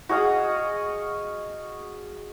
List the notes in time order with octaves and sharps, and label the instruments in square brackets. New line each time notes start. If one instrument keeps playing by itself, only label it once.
[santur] F#4 G#4 D#5 F5